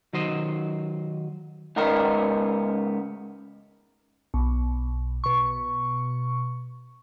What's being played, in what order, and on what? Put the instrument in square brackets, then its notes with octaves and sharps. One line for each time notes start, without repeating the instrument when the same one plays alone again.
[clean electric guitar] D#3 F#3 C5 D#5
C#2 G#2 B3 D#4 A#4
[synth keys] B1
B2 C#6